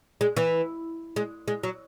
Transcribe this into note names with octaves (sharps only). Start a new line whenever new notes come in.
G#3
E3
G#3
G#3
F#3